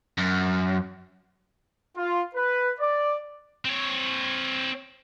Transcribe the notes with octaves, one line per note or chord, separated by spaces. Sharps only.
F#2
F4
B4
D5
C4 C#5